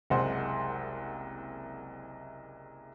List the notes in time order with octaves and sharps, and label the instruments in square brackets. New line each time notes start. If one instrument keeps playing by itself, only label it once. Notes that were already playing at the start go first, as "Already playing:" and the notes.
[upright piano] F#1 C2 G#3 C5 F#5 C6